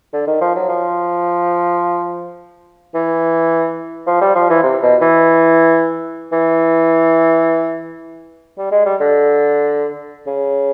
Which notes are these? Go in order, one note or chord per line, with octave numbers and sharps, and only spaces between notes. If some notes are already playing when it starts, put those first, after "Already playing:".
D3
D#3
F3
F#3
F3
E3
F3
G3
F3
E3
C3
B2
E3
E3
G3
G#3
G3
D3
C#3